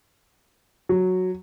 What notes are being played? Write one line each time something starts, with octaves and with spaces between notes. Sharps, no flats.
F#3